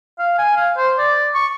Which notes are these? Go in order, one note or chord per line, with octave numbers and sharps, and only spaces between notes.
F5
G#5
F5
C5
D5
C#6